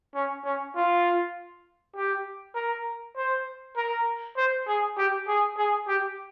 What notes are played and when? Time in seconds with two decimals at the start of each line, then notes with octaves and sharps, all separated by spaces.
0.15 C#4
0.45 C#4
0.76 F4
1.96 G4
2.55 A#4
3.16 C5
3.77 A#4
4.37 C5
4.67 G#4
4.98 G4
5.27 G#4
5.58 G#4
5.88 G4